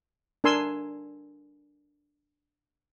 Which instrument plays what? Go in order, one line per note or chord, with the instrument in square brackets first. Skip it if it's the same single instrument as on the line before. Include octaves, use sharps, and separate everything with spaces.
[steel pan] D4 A#4 G#5 C6 E6